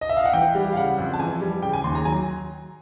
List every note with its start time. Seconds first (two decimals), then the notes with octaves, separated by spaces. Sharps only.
0.01 D#5
0.09 E5
0.17 F5
0.25 F#5
0.33 E3 G5
0.55 G3
0.73 F5
0.76 C#3 F#5
0.98 F2
1.14 A5
1.19 E3 G#5
1.41 G3
1.62 C#3 G5
1.73 G#5
1.84 D#2 C6
1.95 A#5
2.05 F#3 G#5